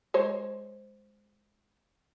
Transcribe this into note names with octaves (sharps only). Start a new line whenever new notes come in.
G#3 C5 C#5